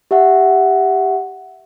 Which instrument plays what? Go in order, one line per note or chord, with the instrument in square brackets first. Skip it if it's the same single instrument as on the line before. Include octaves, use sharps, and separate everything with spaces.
[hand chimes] G4 E5 F#5